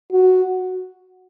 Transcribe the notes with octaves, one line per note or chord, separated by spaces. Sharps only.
F#4